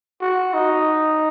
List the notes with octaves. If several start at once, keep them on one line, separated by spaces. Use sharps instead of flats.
F#4
D#4